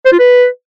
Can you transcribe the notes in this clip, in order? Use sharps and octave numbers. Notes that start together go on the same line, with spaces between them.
C5
F4
B4